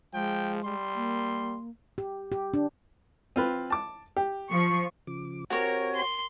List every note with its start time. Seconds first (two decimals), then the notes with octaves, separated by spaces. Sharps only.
0.14 F3 G#3 G5
0.64 G3 C6
0.95 A#3
1.98 G4
2.32 G4
2.54 D4
3.36 C4 F4 B4
3.70 A5 D6
4.17 G4
4.49 F3 C#6
5.07 C#3 F3 D6
5.50 C4 F#4 G4 A#4 C#5 G#5
5.95 C6